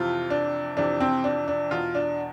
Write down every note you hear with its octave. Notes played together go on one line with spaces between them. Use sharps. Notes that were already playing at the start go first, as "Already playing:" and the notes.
Already playing: F2 C3 E3 F4
D4
F2 C3 E3 D4
C4
D4
D4
E2 B2 F4
D4